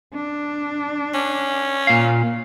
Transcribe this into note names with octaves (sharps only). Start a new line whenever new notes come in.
D4
C#4
A#2 F5